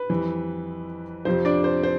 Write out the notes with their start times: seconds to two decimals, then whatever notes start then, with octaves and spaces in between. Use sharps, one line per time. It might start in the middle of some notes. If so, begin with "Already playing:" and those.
Already playing: B4
0.09 F2 E3 G3
1.25 F2 C3 F3 C5
1.45 D4 D5
1.64 C5
1.83 C5